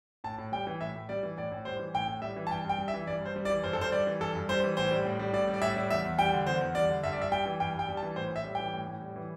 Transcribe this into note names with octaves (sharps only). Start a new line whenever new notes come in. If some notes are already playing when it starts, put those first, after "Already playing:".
A2 A5
A2
G3 G5
E3
A2 E5
A2
G3 D5
E3
A2 D5
A2
G3 C5
E3
A2 G5
A2
G3 E5
E3
A5
G2 G5
G2 G5
G3
E5
E3
G2 D5
G2 C5
G3
D5
E3
G2 C5
A4
G2 C5
G3 D5
E3
G2 A4
G2
G3 C5
E3
A2 C5
G3
A2
G3
A2 D5
G3
D5
A2 E5
G3
E2 E5
E2
G3 G5
D3
E2 C5
E2
G3 D5
D3
G2 E5
D5
G2 E5
G3 G5
E3
G2 G5
G2 G5
G3
A5
E3
A2 C5
A2
E5
G3
E3 G5
A2
A2
G3
E3